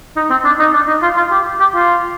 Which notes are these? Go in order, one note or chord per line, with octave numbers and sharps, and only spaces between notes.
D#4
C4
D4
D#4
D4
D#4
F4
F4
G4
G4
F4